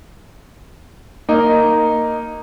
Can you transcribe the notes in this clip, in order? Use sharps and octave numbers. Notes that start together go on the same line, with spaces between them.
A#3 D#4 D#5